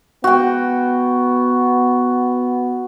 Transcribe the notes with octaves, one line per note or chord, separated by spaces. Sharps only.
B3 F#4 G5